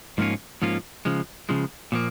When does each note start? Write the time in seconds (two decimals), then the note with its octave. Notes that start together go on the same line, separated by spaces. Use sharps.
0.18 G#2 F3 A#3 C#4 F4
0.62 G#2 F3 A#3 C#4 F4
1.05 C#3 F3 G#3
1.49 C#3 F3 G#3
1.92 A#2 F3 A#3